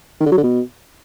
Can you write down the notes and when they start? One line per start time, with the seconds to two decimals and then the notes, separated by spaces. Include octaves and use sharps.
0.20 D#3
0.26 D3
0.32 F#3
0.38 D3
0.43 B2